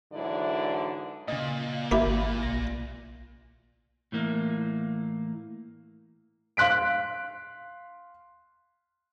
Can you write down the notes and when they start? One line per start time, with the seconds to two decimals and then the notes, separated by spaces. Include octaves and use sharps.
0.13 G#2 D3 E3 F#3 E4 D5
1.28 A#2 C#3 D#5
1.91 G#1 A#3 E4 G4
2.42 B1 A#6
4.12 A2 E3 A#3
6.57 F5 C6 F#6 B6 D7